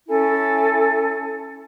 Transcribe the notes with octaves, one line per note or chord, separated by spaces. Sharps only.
C#4 E4 A4 G#5